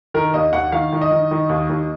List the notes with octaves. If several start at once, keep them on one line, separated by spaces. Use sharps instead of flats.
D#3 A#4
D#2 D#5
D#2 F#5
D#3 F5
D#3
D#5
D#3
D#3
D#2
D#2